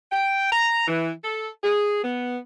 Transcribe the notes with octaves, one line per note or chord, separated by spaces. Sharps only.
G5
A#5
E3
A4
G#4
B3